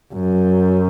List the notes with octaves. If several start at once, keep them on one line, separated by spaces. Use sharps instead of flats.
F#2